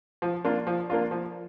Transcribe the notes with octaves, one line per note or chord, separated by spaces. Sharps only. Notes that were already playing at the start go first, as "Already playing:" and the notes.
F3
A#3 D4 F4
F3
A#3 D4 F4
F3